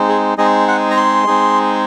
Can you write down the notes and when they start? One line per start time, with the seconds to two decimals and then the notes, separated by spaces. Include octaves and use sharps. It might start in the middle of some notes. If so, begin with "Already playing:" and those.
Already playing: G#3 C4 D#4
0.09 G#4
0.38 G#3 C4 D#4 G#4 D#5
0.68 F#5
0.90 A#5
0.97 C6
1.27 G#3 C4 D#4 G#4